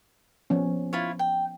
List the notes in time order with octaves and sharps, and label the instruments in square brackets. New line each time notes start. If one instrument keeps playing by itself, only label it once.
[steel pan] F3 B3 C#4
[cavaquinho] E4 F4 C#5
G5